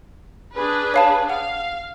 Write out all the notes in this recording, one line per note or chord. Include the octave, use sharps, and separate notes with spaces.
D4 G#4 B4
C#5 F5 A5
F5 F#5